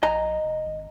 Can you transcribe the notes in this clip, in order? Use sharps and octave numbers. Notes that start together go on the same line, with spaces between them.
A#1 D#5 G#5 A#5
F1
G#1